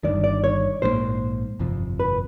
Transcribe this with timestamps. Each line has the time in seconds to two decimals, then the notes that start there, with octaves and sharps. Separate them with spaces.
0.04 G1 G2 D#3 D5
0.24 D5
0.44 C#5
0.82 A#1 G#2 F3 A#3 C5
1.60 G1 F2 C3 F3
2.00 B4